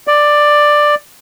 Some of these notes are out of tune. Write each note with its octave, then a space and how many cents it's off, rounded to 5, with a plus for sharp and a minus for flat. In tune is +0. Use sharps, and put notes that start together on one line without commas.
D5 +10